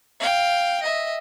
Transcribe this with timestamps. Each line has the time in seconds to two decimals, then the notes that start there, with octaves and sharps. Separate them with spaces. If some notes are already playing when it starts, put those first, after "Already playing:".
0.20 F5 G5
0.82 D#5 E5